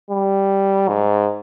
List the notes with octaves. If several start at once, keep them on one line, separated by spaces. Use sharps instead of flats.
G3
G#2